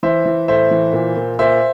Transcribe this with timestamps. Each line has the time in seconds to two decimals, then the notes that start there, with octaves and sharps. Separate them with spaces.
0.03 E3 C5 E5
0.26 E3
0.48 A2 C5 E5
0.71 E3
0.93 A#2
1.16 A#2
1.39 A#2 C5 E5